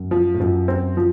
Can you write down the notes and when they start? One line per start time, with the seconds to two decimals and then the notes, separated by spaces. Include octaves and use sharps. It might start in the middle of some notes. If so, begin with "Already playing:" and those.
Already playing: F#2
0.11 F3
0.34 A2
0.40 F#2 F3
0.68 C4
0.97 F3